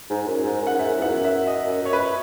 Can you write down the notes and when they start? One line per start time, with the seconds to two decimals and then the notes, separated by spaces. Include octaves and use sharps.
0.10 G#2
0.22 G#2
0.26 F#2
0.44 G#2
0.61 F#2
0.67 F#5
0.78 G#2 E5
0.88 F#2
0.98 E2 F#5
1.09 F#2
1.24 E5
1.47 D#5
1.65 F#2
1.81 F#2 C#5
1.93 B4